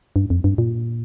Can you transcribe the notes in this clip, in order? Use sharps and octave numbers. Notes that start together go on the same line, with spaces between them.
G2
F2
G2
A#2